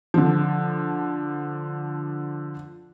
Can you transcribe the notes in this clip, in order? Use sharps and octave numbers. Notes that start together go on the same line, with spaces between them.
D3 F3